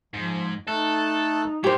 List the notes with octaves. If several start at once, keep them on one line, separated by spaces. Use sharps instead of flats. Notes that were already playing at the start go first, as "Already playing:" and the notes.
G#2 F3
A3 D#4 A4 A5 F#6
A2 G4 C5